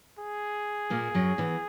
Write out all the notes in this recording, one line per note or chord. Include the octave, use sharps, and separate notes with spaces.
G#4
A#2 A#3
F#2 F#3
E2 E3